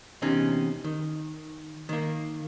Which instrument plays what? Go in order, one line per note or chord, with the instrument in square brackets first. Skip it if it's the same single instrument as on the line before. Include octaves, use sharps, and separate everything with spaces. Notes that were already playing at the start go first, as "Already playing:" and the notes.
[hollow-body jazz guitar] E2 C3 C4 C#4 D#4
D#3
D#3 A#3